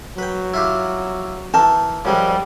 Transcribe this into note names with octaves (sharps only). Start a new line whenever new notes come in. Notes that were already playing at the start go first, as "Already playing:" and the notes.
F#3 B4 G5
E4 F4 G4
E3 A#4 G5 A5
F#2 F3 G3 G#3